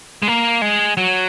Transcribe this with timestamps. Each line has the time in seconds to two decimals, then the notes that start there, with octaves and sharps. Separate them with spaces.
0.23 G#3
0.28 A#3
0.62 G#3
0.97 F#3